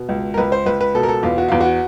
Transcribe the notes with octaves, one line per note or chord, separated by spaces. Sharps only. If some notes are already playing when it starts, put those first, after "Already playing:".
Already playing: B2
C#2
A#4
C#2 B4
C5
C#2 B4
B4
B2 A4
A#4
A4
E2 F4
F#4
E2 F4
F#4